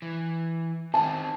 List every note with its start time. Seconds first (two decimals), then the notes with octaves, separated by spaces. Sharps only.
0.02 E3
0.94 D#3 C4 A5